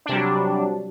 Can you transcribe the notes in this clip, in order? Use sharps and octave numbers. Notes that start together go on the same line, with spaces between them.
C3 F#3 G3 D4